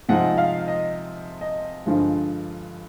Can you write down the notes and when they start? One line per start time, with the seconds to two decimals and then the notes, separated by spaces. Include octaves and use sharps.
0.09 C3 F3 G#3 C4 D#4 F#5
0.38 F5
0.68 D#5
1.41 D#5
1.86 G2 D3 F3 G#3